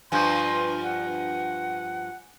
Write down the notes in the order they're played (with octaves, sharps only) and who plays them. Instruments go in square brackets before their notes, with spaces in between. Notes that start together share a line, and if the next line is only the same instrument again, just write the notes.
[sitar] G2 F3 [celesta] G#5 G6 [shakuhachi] C6
[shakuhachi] F#5